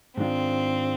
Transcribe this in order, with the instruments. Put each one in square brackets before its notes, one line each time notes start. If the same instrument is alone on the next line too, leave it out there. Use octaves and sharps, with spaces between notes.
[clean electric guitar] G#2 D#3 G#3 D4 F4 [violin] C4